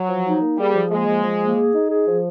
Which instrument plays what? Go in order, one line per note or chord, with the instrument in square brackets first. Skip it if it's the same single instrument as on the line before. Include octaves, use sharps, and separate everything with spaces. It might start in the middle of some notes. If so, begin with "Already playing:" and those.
Already playing: [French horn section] F#3
[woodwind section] F3
D#4
A#3
[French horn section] G3 [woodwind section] G#4
[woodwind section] F3
[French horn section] G#3 [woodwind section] A#3
[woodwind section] F3
F3
A#3
G#4
D#4
G#4
F3